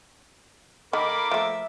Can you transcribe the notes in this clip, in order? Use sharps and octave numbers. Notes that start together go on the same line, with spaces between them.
D#3 A#3 A4 A#4 B5 D6
F3 A3 E5